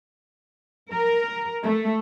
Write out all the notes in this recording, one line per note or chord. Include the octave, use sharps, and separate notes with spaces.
A#4
A3